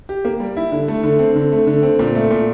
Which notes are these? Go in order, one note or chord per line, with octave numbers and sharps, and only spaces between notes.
G4
A#3
G3
E4
D3
A3
D3
C4
D3
A3
D3
C4
A#2
A3
A#2